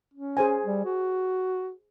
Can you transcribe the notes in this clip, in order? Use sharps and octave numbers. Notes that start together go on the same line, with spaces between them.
C#4
G#4 C5 G#5
G3
F#4